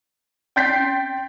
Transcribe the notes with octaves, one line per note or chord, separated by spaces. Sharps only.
G5 C6 G6 A6 B6 C7